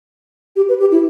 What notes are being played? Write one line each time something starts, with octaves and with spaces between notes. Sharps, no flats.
G4
B4
G4
E4